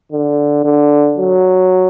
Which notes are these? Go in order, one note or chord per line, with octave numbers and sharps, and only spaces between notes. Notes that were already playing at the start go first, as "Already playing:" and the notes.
D3
D3
F#3